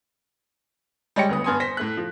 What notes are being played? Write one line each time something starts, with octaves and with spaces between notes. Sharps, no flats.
G3 G#3 C#5 G5 A#6 C#7
D2 B3 D#6
G2 B3 G#5 C6 D#6
C5 A#6 B6
A2 A3 F#6
F3